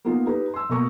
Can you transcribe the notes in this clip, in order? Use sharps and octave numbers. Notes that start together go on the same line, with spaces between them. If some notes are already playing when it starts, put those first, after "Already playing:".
A#3 B3 D#4 F4
D#4 G4 B4
C6 E6
B2 A#3 A#5 C#6